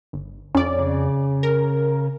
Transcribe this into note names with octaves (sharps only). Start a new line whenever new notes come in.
G1
F2 C#4 D5
C#3
A#4